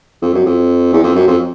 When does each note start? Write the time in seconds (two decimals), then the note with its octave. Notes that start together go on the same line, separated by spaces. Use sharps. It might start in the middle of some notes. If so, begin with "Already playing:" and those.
0.22 F2
0.34 F#2
0.46 F2
0.93 E2
1.04 F2
1.15 F#2
1.28 F2